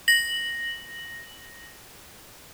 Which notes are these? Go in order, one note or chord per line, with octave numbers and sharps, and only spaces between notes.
A#6 F#7